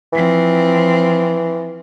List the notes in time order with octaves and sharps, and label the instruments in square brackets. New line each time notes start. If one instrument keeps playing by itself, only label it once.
[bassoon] E3 [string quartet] F3 C4